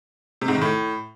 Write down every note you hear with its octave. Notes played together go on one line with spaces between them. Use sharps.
C3
G#2
D#3
A2